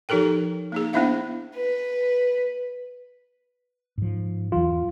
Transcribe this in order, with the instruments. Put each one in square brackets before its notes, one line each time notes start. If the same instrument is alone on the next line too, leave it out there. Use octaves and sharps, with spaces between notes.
[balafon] F3 D#4 G4 A4 A#4 G5
A#3 D#4 G#4
B3 D4 E4 C5 E5 F5
[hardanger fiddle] B4
[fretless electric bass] G#2 F3
[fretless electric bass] E2 E3 F#3 [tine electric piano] F4